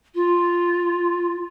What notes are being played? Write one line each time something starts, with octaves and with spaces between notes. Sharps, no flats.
F4